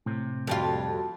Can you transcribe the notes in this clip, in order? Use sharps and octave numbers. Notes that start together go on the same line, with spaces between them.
A2 C3
F2 G3 F4 F#4 A4 A5